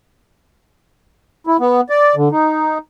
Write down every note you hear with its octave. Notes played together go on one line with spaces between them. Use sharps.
E4
B3
D5
D3
D#4